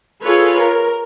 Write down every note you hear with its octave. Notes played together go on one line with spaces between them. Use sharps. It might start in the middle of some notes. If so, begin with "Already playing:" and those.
F4 G#4 A4 B4 C#5
A#4